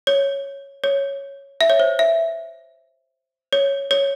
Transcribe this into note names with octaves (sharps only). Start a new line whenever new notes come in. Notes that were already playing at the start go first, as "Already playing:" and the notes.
C#5
C#5
E5
C#5
C5
E5
C#5
C#5